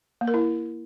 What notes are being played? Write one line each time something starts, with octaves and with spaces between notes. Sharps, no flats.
A#3
A#4
E4